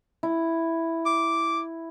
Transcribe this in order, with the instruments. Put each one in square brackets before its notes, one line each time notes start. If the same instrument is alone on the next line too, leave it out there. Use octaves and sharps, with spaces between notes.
[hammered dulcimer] E4
[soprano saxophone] D6